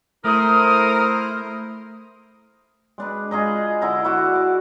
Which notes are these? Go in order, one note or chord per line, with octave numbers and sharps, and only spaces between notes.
A3 E4 A#4 C5 D#6
G#3 D4 B4
F4 G#4 D#5 A#5
D3 E4 A#5
E4 F#4 D5
D5